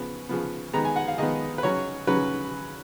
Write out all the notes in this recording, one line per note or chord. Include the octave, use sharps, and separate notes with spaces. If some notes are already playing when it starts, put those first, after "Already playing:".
Already playing: C#3 F3 B3
C#3 F3 B3
D#3 G#3 B3 A#5
G#5
F#5
F5
D#3 G#3 B3 D#5
B4
C#3 F#3 C#4 C#5
C#3 F#3 C#4 B4